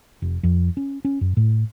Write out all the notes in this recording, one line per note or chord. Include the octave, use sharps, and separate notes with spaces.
F1
F2
C#4
C#4
F#2
A2